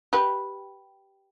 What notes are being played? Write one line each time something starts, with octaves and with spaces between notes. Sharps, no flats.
G4 B4